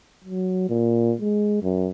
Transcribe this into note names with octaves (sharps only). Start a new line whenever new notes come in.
F#3
A#2
G#3
F#2